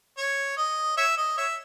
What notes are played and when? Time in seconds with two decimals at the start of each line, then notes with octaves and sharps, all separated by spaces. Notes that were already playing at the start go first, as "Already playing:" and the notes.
0.18 C#5
0.57 D#5
0.97 C#5 E5
1.17 D#5
1.38 C#5 E5